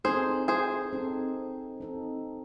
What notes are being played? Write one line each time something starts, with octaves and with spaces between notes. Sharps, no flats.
C4 D#4 G#4 A4 C5
G#4 C5
C4 D#4 A4
C4 D#4 A4